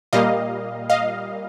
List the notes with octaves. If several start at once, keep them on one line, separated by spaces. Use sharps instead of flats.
A#2 G3 A#3 D#5 F5
D#5 F5